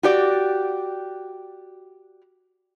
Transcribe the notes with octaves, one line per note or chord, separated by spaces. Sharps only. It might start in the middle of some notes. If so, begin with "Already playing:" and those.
F#4 G4 D5